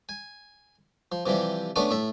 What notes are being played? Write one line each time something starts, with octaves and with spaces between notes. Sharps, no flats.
G#5
F3
C3 E3 F3 G3
A3 B3 C#4 D4 D5
A2 E5 A5